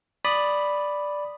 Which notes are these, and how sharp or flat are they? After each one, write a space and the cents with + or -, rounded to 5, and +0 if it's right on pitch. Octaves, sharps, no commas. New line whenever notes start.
D5 +0 B5 +0 D#6 -15